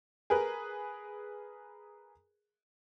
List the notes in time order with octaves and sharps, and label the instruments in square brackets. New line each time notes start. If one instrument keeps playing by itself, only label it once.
[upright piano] G#4 A#4 B4